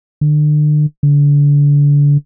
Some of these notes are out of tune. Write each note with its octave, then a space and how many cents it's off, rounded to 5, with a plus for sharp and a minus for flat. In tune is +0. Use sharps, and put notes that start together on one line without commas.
D3 +35
D3 -30